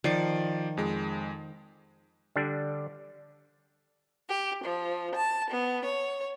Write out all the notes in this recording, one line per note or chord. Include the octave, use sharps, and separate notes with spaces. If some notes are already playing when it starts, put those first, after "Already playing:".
D#3 F3 D5 C7
F2 G#3
D3 G3 D4
G4
F3
A5
B3
C#5